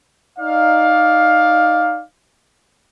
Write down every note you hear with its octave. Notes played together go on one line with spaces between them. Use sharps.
D#4 D5 F5